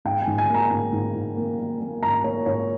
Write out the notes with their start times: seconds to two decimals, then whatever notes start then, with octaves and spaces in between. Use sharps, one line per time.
0.05 G#2 G5
0.22 G#5
0.27 G#2
0.38 G#5
0.49 A#3
0.54 A#5
0.71 G#2
0.93 G#2
1.15 G#2
1.37 A#3
1.59 A#3
1.81 A#3
2.03 G#2 A#5
2.24 A#3 C#5
2.46 G#2 C#5